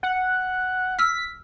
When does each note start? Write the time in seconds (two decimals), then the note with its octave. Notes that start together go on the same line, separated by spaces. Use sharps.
0.03 F#5
0.99 E6 F6 B6